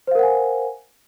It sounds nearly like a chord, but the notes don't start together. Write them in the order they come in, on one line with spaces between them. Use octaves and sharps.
C5 F5 A#4 F#5 G#5